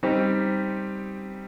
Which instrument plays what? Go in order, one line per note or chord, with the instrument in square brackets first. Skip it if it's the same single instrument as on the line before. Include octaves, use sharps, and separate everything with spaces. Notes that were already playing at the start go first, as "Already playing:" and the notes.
[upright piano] G3 C4 D#4 G4